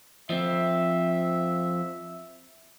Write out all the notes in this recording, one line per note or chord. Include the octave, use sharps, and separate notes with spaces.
F3 C4 E5